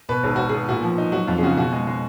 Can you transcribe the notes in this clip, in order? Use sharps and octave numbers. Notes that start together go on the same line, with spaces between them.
B2 B4
G#1 G#4
G#1 F#4
G#4
B3
A#2 F#4
F3
D#4
F#3 F#4
F2 F4
G#4
C#3 F#4
B2 F#4
G#3
G#3